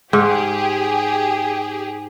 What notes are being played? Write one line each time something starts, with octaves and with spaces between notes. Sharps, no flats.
G#2 G4 G#4